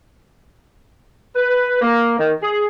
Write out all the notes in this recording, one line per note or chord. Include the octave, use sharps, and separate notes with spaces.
B4
A#3
D#3
G#4